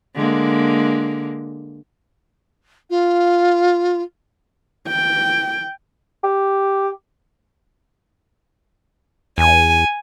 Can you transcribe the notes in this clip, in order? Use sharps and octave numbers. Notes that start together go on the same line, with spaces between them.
D3 G#3 A#3
F4
G5
G4
E2 G#5